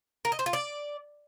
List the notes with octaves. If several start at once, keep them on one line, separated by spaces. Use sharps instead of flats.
A#4
D#5
C5
F4
D5